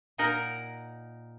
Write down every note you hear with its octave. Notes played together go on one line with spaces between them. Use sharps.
A#2 D#4 A#4 D#5 F#5